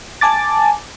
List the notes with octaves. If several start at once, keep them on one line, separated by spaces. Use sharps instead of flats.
G#5 A5 D6 A6